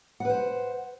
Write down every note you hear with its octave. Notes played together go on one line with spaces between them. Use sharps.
B4 C5 F#5